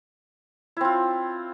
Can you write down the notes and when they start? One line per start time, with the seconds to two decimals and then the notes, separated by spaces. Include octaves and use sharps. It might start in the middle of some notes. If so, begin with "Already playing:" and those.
0.77 E4
0.81 C4
0.85 F4